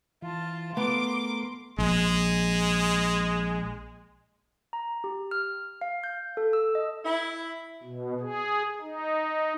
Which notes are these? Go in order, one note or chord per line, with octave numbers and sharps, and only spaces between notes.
E3 F4 A5
A3 B3 A#4 C6 D6
A#1 G#3
A#5
G4
F6
F5
G6
A4
E6
D#5
E4
B2
G#4
D#4